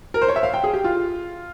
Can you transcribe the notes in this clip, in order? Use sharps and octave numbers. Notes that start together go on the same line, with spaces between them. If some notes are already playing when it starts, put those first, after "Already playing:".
A#4
C5
C#5
E5
F5
G5
G#4
G4
F4